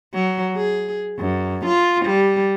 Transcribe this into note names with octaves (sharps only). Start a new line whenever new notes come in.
F#3
G#4
F#2
F4
G3